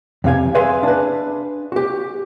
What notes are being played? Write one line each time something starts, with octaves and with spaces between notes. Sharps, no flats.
F2 C3 F5 G#5
G#4 B4 E5 F5 G#5 C6
D4 B4
F#4 G4